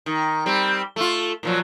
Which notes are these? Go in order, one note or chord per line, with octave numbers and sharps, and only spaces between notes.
D#3
G3 C4
A3 F4
A#2 F3 F#3